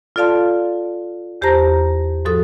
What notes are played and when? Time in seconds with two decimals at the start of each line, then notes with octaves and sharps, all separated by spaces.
0.16 F4 A4 D5 F5 A5 C6
1.42 E2 G4 C5 A5 A#5 A#6
2.25 G#2 F3 F#4 A4 D#6